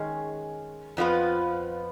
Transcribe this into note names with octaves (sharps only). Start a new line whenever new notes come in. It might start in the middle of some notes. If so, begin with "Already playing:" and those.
Already playing: D#3 G#3 C#4 G#4
F2 F3 B3 F4 B4